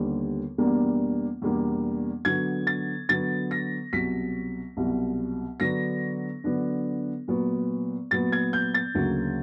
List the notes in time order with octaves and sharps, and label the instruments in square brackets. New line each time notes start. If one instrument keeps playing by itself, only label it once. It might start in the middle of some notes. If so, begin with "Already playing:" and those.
Already playing: [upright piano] D#2 D3 G3 B3
E2 B2 G3 A#3 D4
E2 B2 G3 A#3 D4
D3 F#3 B3 G#6
A6
D3 F#3 B3 A6
A#6
C2 B2 F#3 B6
C2 B2 F#3
D3 F#3 B3 D4 A#6
D3 F#3 B3 D4
A#2 F#3 B3
A#2 F#3 B3 A6
G#6
G6
A6
D2 C#3 F#3 A#3